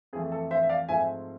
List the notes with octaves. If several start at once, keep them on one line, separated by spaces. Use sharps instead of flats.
F2 E3 A3 G#4
A4
C5 E5
E5
D5 F5
G#2 F3 A3 C4 E5 G#5